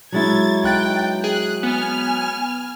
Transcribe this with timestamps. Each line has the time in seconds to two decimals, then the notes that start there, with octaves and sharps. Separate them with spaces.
0.12 F#3 G#3 E4 G#6 A6
0.64 B1 G5 F#6 A6
1.24 G#4 F#6
1.63 B3 G#5 F6